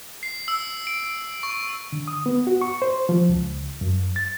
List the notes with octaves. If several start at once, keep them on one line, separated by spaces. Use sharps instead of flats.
C7
E6
D7
C#6
D3
D#6
B3
F#4
C#6
C5
F3
C#2
F#2
A6